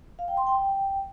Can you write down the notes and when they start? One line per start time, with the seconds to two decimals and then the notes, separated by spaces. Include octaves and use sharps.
0.19 F5
0.28 G5
0.37 C6
0.47 G5